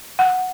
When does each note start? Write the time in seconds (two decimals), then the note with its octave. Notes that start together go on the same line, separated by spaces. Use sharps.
0.19 F#5